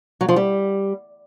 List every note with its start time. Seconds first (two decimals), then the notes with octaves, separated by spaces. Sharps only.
0.21 F#3
0.28 F3
0.36 G3